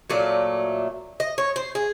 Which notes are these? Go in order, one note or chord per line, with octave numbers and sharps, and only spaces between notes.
A#2 F#3 A3 D5
D#5
C#5
C5
G#4